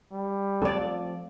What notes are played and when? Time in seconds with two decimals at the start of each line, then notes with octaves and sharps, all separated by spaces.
0.12 G3
0.62 F3 A3 C4 A4 D5